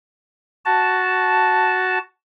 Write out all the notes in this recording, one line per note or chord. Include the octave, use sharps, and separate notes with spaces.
F#4 A5